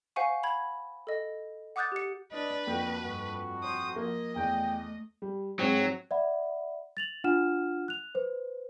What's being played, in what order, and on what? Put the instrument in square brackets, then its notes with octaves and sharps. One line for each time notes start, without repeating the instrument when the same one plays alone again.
[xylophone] C5 F5 F#5 G#5 C#6
B5 G#6
A4 D#5
F#5 D6 D#6 F#6 G6 A6
G4 C#7
[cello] D4 [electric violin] B4 [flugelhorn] D#5
[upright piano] F2 [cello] A#3 F#4 [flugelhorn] G5
[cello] G2 [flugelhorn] F#4
[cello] C5 [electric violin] D#6
[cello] F3 [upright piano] A#3 [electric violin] D#5
[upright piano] E2 [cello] A3 [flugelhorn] G5
[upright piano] G3
[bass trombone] G#2 [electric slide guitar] F#3 [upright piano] C4
[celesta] D5 E5 F#5 B5
A6 F7 F#7
D4 F4 F#5 F6 E7
F#6 F7
B4 C5